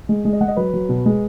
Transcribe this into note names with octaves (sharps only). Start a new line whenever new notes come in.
G#3
G#3
D#5
G#3 F#5
D#5
F#3 B4
F#3
B2
G#3